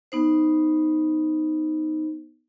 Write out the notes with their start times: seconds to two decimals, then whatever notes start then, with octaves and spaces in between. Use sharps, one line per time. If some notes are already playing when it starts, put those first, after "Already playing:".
0.12 B3 D#4 C5